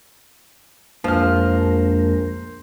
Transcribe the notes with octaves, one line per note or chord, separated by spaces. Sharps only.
A#1 F2 F3 G#3 A#4 C5 F6